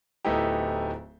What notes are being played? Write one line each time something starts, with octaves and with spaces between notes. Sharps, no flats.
D1 A3 B3 D#4 E4 G4